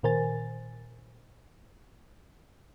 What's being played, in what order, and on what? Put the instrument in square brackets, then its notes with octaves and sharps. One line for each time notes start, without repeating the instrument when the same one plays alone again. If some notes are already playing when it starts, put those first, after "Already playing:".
[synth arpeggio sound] A#2 D#3 A#4 C5 G#5 A6